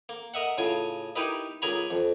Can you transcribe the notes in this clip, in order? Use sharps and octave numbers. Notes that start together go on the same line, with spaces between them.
A#3
A#4 D#5 E5 F#5
A2 C#3 F4 G#5
D#4 E4 G4 A#4 B4 D#5
C#2 G#4 A#4 G#5 A#5 B5
F2